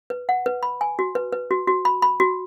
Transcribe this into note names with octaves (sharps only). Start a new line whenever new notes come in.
B4
F#5
B4
B5
G#5
F#4
B4
B4
F#4
F#4
B5
B5
F#4